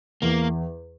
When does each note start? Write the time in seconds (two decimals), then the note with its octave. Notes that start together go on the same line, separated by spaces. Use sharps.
0.22 E2 A#3